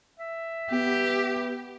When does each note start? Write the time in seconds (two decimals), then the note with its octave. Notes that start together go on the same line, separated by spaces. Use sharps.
0.19 E5
0.71 B3 G4